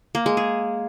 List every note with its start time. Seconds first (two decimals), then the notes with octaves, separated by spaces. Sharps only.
0.15 A#3
0.26 G#3
0.37 G#4